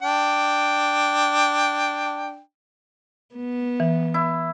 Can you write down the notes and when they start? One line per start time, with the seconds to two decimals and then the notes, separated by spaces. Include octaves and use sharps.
0.02 D4 G5
3.35 B3
3.80 E3
4.14 E4